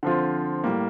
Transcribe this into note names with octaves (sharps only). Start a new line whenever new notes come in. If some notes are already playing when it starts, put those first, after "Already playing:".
D3 F3 C4 F4
A2 G3 A#3